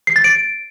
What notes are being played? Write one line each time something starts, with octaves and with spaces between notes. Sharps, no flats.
C7
A6
D7